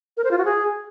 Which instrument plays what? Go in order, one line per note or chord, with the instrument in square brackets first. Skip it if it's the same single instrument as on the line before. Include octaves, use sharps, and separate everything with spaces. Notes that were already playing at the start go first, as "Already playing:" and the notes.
[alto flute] A#4
C5
F4
F#4
G#4